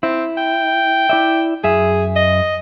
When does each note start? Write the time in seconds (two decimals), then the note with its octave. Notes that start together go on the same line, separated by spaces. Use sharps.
0.03 C4 E4
0.37 G5
1.10 E4 D5 E5
1.64 F#2 G#4 E5
2.16 D#5